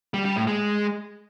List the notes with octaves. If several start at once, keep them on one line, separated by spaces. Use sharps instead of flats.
G3
G3
A2
G#3